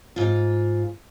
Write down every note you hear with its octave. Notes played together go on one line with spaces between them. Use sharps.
G#2 F4